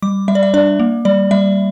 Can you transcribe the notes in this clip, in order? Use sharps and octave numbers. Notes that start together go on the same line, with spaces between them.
G3 D6
G3 E5
D5
E5
D4 D5
A#3
G3 D5
G3 E5